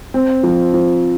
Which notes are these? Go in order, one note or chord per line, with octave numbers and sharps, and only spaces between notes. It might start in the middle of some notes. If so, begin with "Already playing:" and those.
C4
F3
F3